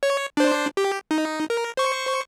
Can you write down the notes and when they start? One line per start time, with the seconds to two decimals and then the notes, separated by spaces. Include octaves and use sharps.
0.03 C#5
0.37 D4 C5
0.77 G4
1.11 D#4
1.50 A#4
1.77 C5 C#6